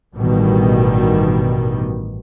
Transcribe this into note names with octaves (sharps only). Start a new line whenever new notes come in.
A1 G2 B2 D#3 G3